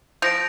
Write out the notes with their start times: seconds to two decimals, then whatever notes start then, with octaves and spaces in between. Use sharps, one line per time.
0.22 F3 G6 A#6 D7